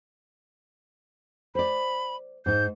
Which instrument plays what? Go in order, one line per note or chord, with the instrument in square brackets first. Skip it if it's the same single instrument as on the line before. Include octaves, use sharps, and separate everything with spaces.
[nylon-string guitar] C5 D5 [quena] B5
[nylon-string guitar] G#2 D#4 [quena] G6